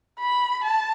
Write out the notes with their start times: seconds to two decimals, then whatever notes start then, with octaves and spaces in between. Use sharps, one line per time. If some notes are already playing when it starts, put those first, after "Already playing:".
0.19 B5
0.64 A5